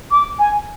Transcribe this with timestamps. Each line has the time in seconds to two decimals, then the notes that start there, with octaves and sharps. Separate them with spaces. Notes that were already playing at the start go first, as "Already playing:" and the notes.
0.11 D6
0.39 G#5